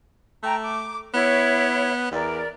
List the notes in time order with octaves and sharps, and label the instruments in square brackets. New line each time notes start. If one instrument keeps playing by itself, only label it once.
[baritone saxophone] A3 [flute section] G5 A#5
[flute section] D6
[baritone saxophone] B3 [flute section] E4 C#5
[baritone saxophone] E2 [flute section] A#4 D5